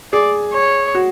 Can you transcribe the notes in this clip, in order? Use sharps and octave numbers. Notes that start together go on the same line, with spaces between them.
G#4 D5
C#5
F#4